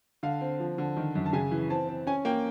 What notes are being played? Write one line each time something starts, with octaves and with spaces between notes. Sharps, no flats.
D3 F5
C4
F3
D3
D#3
F#2
A5
C#3 G#5
E3
C4 A5
C4
C#4 G#5
A#3 G5